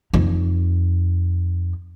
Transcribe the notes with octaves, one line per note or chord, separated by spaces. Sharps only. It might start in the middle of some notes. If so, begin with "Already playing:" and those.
F2 D#4